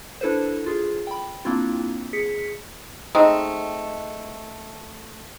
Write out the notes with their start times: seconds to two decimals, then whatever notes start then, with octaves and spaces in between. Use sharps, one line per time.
0.21 D4 E4 A4 B4 C5
0.66 F4 G#4
1.07 G5 B5
1.45 A#3 C4 D4 E4 F4
2.13 G#4 B6 C#7
3.15 G#3 A3 C4 D#4